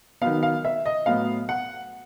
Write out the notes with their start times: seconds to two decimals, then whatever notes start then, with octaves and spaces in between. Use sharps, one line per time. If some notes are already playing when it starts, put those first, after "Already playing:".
0.22 D#3 F#3 B3 F5
0.43 F5
0.65 E5
0.86 D#5
1.06 A2 F#3 B3 F5
1.49 F#5